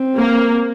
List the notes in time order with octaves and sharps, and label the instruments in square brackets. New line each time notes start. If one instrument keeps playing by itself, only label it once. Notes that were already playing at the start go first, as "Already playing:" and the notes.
Already playing: [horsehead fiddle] C4
[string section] A#3